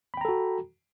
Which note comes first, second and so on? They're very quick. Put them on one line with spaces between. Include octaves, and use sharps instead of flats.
B5 G5 A#5 A4 F#4